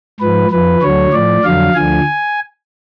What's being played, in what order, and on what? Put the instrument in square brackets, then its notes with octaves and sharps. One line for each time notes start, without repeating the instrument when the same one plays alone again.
[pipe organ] G#2 F3 B4
F2 F3 B4
D2 D3 F#3 C#5
A2 F3 D5
F2 D3 F#3 F5
D2 D3 F3 G#5